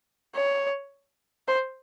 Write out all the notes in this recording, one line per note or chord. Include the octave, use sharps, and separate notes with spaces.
C#5
C5